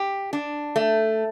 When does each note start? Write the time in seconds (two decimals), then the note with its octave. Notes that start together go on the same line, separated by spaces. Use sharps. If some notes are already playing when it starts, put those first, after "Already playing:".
Already playing: G4
0.33 D4
0.76 A3